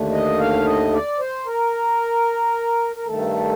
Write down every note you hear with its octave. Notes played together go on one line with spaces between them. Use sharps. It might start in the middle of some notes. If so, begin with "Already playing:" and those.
Already playing: D#2 D3 A3
D#5
F5
D#5
D5
C5
A#4
A#4
G2 D#3 A3 A4